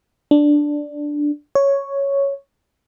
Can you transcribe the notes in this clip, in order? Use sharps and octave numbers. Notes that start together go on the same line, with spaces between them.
D4
C#5